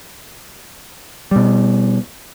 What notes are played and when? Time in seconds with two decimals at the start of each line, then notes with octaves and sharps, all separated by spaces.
1.31 B2 G3